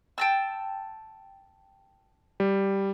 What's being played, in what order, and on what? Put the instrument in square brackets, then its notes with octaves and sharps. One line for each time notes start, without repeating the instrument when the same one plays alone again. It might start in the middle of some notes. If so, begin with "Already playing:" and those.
[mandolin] G5 A5 E6
[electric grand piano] G3